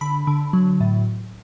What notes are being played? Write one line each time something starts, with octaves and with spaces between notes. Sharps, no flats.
D3 B5
D3
F#3
A2